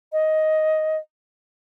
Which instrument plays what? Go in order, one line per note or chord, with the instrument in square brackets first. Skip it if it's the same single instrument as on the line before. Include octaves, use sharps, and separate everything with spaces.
[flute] D#5